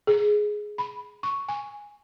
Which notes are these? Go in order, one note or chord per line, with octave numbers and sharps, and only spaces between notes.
G#4
B5
C#6
G#5